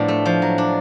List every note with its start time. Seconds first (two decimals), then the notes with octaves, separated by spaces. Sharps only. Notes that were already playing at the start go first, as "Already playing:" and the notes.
Already playing: A2 F3 B3 D4 D5
0.08 A3
0.25 F3
0.42 F#3
0.58 D4